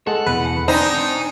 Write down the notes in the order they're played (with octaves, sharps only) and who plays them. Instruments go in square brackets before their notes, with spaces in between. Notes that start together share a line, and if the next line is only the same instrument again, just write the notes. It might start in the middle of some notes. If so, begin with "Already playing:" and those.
[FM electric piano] G#3 [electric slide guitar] A4 [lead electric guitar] F#5
[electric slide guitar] E2 B2 E3 [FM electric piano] B4
[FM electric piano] C4 [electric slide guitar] D4 [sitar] D#4 [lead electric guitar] C5 G#5